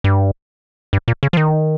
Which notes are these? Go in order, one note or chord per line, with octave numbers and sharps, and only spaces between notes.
G2
G2
A#2
C#3
F3
D#3